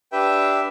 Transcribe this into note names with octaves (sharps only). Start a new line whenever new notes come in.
D4 G4 B4 E5 G5